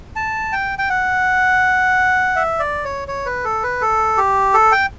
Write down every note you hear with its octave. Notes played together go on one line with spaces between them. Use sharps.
A5
G5
G5
F#5
E5
D5
C#5
C#5
B4
A4
B4
A4
G4
A4
G5